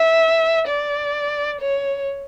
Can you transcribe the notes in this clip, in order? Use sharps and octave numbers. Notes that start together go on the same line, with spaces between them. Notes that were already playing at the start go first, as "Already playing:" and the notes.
Already playing: E5
D5
C#5